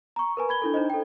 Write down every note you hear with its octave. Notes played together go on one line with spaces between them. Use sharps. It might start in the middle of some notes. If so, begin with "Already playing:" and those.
A#5 C#6
A#4 B4 G#5
B5 G#6 G7
D4 E4 A4
D4 D#4 C5 D#5
A4 G5